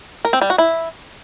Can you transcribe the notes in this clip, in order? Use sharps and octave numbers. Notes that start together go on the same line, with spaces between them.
A#4
C4
G3
F#4
E4